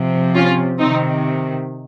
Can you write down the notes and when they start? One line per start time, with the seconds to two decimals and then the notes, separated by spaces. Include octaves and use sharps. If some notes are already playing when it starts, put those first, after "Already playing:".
Already playing: C3 F3
0.35 C#4 F4
0.79 C3 D#3 C4 D#4